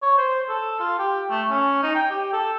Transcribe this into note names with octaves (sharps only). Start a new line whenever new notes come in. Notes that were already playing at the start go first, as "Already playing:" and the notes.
C#5
C5
A4
F4
G4
A3
C#4
D#4
G5
G4
A4